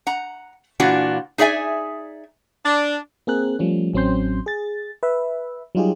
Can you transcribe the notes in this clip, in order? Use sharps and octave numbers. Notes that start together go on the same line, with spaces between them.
F#5 A#5
A#2 E3 D4 F4 F#4
D#4 G#4 D5 E5 G#5
D4
A#3 C4 G#4 A#4 F#6
F3 G3 A3 C#4
A1 F#3 C4 C#4 C6 G6
G#4 A6
B4 E5
F#3 G3 D#4 F4 G4 G#4